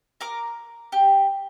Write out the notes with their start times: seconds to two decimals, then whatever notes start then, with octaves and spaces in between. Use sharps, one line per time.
0.21 A#4 A#5 D6
0.92 G4